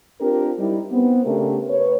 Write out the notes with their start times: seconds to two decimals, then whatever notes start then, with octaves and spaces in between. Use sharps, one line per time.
0.20 C4 D4 F4 G4 A#4
0.59 G3 D#4 E4
0.91 B3 C4 B4
1.25 C#3 A3 C4 D4 G4 A#4
1.67 B4 C#5